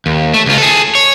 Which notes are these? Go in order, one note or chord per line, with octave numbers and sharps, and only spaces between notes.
D#2
A3
C#2 F4
G#4 A4
C#5